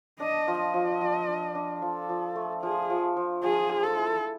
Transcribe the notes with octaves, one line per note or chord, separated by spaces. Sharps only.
D4 D#5
F3
D#5
F3
F3
D4
D4
F3 A4
F3
A3
F3 G#4
F3
F3
F3 G#4
G#3
A4
E4